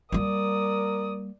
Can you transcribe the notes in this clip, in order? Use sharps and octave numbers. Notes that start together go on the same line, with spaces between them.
G3 A#3 A#4 D5 D#6